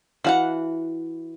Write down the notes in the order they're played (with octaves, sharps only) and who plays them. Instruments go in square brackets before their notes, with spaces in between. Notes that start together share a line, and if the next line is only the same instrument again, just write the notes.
[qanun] E3 [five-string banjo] F#4 F5 F#5